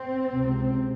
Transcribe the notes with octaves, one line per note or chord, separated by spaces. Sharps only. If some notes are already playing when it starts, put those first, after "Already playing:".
Already playing: C4
C#2 C3